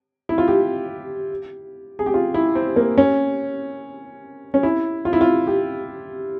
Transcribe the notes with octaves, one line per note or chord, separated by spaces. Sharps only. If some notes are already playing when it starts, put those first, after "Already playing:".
E4
F4
G4
G#4
G4
F4
E4
C4
A#3
C#4
C#4
E4
F4
E4
F4
G4